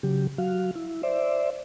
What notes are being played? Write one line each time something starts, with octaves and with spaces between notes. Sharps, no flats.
C#3 F#3 G4
F#3 F#4 F5
E4
C5 D5 E5